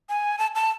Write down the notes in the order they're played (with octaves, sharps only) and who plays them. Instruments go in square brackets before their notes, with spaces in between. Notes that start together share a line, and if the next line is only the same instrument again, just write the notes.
[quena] G#5
A5
A5